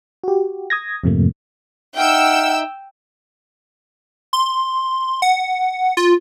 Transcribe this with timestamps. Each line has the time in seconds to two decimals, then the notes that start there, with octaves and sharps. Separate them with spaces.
0.24 F#4 G4
0.70 D#6 G#6 A#6
1.04 F2 G#2 C3 F3 A3 A#3
1.96 D#4 E5 F#5 G5 E6 F6
4.33 C6
5.22 F#5
5.97 F4